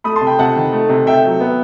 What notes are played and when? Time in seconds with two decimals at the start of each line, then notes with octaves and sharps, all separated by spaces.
0.04 A3 B5 D#6
0.16 A5 C6
0.21 C3
0.27 G5 B5
0.39 C3 F#5 A5
0.56 D#3
0.73 A3
0.89 C3
1.06 C3 E5 G5
1.24 F#3
1.40 B3